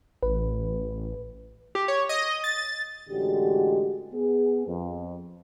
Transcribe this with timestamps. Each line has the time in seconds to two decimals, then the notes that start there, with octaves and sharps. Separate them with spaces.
0.23 A1 B4
1.75 G4
1.88 C#5
2.09 D#5
2.44 A6
3.09 A1 D3 G#3 F#4 G4
4.14 B3 G#4
4.67 F2